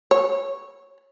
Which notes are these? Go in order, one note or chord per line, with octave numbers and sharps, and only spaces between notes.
C#5